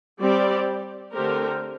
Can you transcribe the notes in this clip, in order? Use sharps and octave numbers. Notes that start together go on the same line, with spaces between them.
G3 C4 G4 D5
D3 A3 C4 G4 A#4